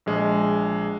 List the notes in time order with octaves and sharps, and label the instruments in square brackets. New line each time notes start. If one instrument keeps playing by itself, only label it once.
[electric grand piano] A#1 G#3